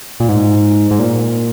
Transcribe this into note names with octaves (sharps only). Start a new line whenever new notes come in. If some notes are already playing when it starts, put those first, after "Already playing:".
A#2
G#2
G#2
A#2